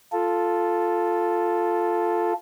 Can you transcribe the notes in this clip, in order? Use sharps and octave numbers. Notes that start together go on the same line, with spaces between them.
F4 A4